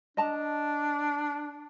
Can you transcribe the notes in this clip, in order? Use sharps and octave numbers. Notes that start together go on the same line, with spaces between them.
D4 D#5 A5 A#5